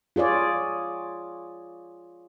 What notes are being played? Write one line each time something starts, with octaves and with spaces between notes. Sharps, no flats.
F4 G#4 C#5 D5